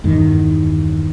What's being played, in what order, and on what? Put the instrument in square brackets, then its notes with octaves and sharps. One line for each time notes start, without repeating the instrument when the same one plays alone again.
[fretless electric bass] E2 G2 D#3